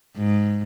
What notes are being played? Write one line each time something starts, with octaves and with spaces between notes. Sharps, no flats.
G#2